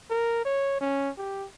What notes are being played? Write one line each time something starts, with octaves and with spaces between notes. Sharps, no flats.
A#4
C#5
C#4
G4